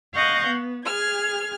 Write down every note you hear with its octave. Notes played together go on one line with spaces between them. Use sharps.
D#5 F5 F#5 C#6 G6 A#6
B3
G#4 F6 G#6